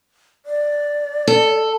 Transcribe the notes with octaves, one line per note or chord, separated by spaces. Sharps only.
D5
A4